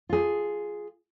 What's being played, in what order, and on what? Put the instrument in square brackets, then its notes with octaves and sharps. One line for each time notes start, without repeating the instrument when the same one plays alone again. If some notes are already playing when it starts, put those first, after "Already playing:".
[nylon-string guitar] F4 G#4